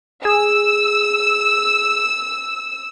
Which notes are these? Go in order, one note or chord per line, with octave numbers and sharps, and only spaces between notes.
G#4 E6